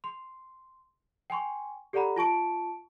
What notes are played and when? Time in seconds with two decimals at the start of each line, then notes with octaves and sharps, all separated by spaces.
0.04 C6
1.30 G5 G#5 C6 C#6
1.93 G4 A4 D5 F#5 A#5 B5
2.16 F4 A5 C#6 D7